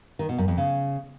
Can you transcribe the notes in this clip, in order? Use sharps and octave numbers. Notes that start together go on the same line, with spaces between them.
D#3
B2
F#2
F2
C#3